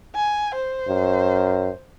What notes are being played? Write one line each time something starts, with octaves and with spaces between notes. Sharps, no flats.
G#5
C5
F#2